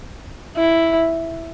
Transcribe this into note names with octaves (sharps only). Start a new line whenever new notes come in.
E4